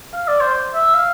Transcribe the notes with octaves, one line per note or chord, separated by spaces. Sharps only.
F5
D5
C5
E5
F5